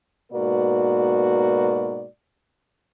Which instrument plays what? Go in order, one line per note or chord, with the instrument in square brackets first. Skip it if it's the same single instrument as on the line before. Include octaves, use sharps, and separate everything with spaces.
[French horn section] G#2 B2 A#3 F#4 B4 D5